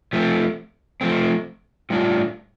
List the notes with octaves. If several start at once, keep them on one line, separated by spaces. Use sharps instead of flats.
F3 A3 C4
F3 A3 C4
A2 G3 D4 F4